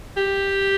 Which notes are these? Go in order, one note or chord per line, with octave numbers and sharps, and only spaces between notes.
G4